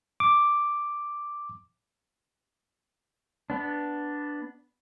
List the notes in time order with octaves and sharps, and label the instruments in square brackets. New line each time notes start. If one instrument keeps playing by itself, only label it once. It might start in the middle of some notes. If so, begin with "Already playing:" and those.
[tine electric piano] D6
[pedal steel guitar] B3 D4